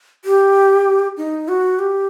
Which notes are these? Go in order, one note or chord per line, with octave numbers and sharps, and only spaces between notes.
G4
D#4
F#4
G4